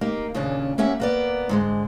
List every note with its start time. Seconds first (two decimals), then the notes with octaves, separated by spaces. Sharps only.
0.01 A#3 D#4 G4
0.34 D#2 A#2 C#3 C#4 D4
0.78 A#3 C#4 G4 E5 F#5
1.00 A#3 B3 D5
1.49 G#2 D3 G#3